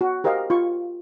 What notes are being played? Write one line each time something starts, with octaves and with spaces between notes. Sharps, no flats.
F#4
G4 A#4 C5 D#5 F5
F4 C#6